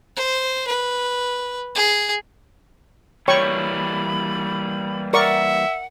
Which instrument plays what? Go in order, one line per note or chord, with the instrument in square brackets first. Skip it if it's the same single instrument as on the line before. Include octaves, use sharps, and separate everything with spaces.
[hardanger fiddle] C5
B4
G#4
[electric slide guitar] E3 G3 A#3 [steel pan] C#5 G5 C#6 [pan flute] B5
[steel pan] A#4 D5 C#6 [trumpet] E5 [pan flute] F#5